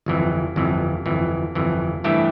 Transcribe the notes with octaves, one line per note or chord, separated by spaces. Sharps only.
G1 F2 E3
G1 F2 E3
G1 F2 E3
G1 F2 E3
G2 E3 A3 E4 G4